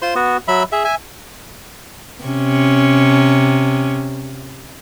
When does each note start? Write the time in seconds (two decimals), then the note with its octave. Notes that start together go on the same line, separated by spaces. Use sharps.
0.02 F4 C5 C6
0.15 B3 F#4
0.48 F#3 E5 B5
0.72 G#4 E5
0.85 E5 G#5
2.24 C3 C#4